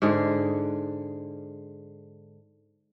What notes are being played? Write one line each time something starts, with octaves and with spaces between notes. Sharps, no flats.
G#2 D3 G#4